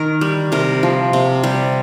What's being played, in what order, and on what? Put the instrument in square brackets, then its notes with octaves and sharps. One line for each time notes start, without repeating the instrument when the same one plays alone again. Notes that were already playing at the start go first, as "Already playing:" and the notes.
Already playing: [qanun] D#3 A#4
G3
C3 A#4
F3
C3
G3